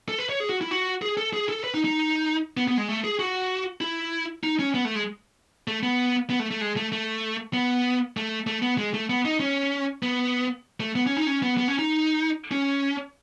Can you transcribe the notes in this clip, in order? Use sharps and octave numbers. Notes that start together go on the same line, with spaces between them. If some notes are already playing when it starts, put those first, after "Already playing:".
A4
B4
C#5
G#4
F#4
E4
F#4
G#4
A4
G#4
A4
B4
D#4
D#4
B3
B3
G#3
A3
G#4
F#4
E4
D#4
C#4
B3
A3
G#3
A3
B3
B3
A3
A3
G#3
A3
A3
B3
A3
A3
B3
G#3
A3
B3
D#4
C#4
B3
A3
B3
C#4
D#4
C#4
B3
B3
C#4
D#4
C#4